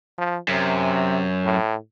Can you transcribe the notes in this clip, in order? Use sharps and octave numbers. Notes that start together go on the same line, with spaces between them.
F3
F#2 C3
A2